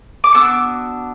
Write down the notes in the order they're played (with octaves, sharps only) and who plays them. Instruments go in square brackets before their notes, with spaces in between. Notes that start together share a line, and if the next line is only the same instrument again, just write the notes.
[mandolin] D6
B3 D4 F#4 E6